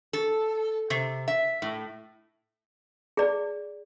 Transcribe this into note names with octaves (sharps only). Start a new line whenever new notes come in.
A4
C3
E5
A2
G#4 D5